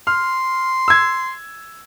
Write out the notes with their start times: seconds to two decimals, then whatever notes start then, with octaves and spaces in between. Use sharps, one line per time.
0.07 C6 F6
0.88 E6 G#6